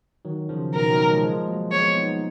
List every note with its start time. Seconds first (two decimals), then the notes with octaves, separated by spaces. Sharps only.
0.25 D#3 F#3
0.49 C#3 F3
0.74 B2 D#3 A#4
0.90 D#3 F#3
1.06 F3 G#3
1.23 F3 G#3
1.48 F#3 A#3
1.72 G#3 B3 C#5
1.96 B3 D#4
2.09 D#4